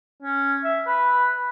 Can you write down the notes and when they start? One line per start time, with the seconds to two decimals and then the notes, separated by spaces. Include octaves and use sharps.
0.23 C#4
0.64 E5
0.87 B4